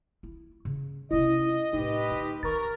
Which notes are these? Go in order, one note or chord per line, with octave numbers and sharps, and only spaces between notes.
E4
C#3
C3 C#4 E4 D#5
A2 C4 D#4 G4 B4
D3
D#3 A#4 C#6 A6